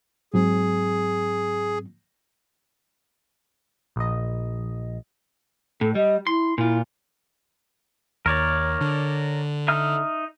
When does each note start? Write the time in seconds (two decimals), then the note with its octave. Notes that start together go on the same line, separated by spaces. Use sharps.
0.34 G#2 F#3 C4 G#4
3.96 A#1 D#5
5.81 A2 A4
5.95 G3 D#5
6.27 E4 C6
6.58 A#2 E4 F4
8.26 D#2 A#4 C#5 D5
8.81 D3
9.68 D#4 E5 F6